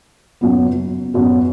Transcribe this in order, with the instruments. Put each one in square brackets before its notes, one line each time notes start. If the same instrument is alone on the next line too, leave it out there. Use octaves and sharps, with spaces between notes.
[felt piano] F#2 F#3 B3
F#2 F#3 B3